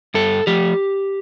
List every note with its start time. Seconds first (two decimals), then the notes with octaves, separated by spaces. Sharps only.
0.14 G2 A4
0.47 F3 A3 G4